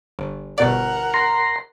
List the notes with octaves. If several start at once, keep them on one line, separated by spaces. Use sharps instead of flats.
G1
G1 B2 A#4 D5 F#5
A#5 C6